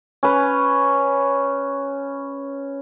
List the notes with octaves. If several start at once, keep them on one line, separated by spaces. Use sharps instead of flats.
C#4 B4